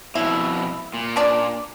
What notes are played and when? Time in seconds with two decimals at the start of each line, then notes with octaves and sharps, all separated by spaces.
0.15 F2 B2 E4
0.94 A#2
1.16 C#4 D4 D5